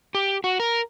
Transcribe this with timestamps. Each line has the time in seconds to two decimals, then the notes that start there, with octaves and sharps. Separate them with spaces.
0.15 G4
0.44 F#4
0.60 A#4